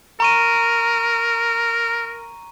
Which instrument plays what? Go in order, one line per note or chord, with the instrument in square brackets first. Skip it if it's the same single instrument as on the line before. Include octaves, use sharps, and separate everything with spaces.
[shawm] A#4 [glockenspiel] A#5 C#6 D#7